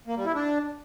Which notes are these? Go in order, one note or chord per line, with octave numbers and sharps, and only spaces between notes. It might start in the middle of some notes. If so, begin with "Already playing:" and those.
A#3
G3
E4
D4